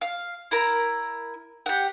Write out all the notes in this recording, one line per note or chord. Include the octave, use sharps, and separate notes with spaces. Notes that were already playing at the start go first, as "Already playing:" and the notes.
F5
E4 A#4 A#5
G4 F#5